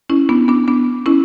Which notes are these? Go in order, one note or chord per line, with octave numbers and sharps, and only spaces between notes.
C#4 E4
B3 D4
B3 D4
B3 D4
C#4 E4